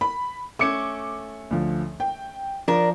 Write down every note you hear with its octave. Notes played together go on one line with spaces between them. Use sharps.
B5
A3 C#4 D6 C#7
D2 F3
G5
F3 D4 A#4